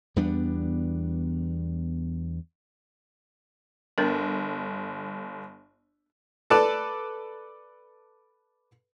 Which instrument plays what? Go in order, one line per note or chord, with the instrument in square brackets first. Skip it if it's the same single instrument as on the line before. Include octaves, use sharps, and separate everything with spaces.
[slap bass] E2 G3 B3 D4
[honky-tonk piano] G1 [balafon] B3 D4 A#4
[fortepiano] A4 B4 D5 A5